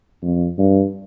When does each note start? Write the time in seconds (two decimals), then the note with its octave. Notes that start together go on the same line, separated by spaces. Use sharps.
0.22 F2
0.58 G2